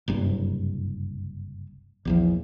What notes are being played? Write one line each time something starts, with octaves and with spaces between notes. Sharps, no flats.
F#1 C2 G2
A#1 E2 F3